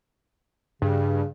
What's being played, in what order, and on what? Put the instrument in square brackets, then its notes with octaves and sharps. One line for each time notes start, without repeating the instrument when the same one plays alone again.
[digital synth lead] G2 [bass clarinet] C#3